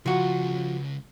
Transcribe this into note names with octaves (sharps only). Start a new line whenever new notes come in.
C#2 F3 F#4